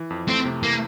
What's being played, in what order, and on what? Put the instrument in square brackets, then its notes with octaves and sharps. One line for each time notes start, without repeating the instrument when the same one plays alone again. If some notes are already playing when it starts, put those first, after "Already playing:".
Already playing: [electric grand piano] E3
F2
[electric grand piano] A3 [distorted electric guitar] C4
[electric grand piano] C3
[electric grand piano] E3 [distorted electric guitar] A#3